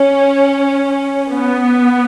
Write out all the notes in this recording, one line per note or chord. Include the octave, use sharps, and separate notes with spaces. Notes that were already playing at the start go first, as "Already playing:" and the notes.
Already playing: C#4
B3